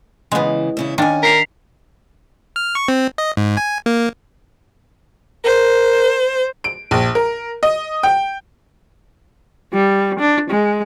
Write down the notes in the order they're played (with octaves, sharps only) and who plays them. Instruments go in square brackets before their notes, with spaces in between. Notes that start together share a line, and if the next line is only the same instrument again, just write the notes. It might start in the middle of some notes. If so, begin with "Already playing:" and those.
[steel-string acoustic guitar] C#3 E3 [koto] G#3 B3
[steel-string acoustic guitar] E2 C#3 E4
[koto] D#3 A#3 D4 [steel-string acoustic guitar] C#4 G#5
[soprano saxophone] A#4 [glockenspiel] B6 C7 F7
[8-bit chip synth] F6
C#6
C4
D#5
G#2
G#5
A#3
[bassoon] A#4 [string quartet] C5
[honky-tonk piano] D7
A#1
A#4
D#5
G5
[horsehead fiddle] G3
D4
G#3